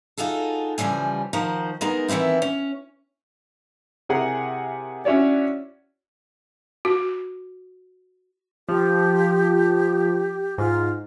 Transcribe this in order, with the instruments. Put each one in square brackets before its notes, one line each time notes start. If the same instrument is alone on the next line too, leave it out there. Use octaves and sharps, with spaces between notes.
[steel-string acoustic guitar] D#4 F4 F#4 G#4 A4
C#3 E3 F3 G3 G#5
D#3 F3 D#4 F#4 C5
G#3 B3 D#4 G#4 A#4
D#3 E3 B3 C4 E4
C#4
[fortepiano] C3 E4 G#4 A#4 F#5 G#5
C#4 D4 E4 F#4 C#5 D5
[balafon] F#4
[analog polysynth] F3 [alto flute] G4
[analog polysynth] G#2 [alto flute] F4